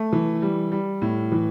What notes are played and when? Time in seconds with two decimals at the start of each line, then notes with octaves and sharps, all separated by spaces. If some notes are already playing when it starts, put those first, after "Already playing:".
Already playing: A3
0.13 E3
0.42 G3
0.72 G3
1.02 A2
1.32 E3